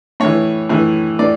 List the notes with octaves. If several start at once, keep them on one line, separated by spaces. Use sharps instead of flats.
A2 E3 C#5
A2 E3
A2 D5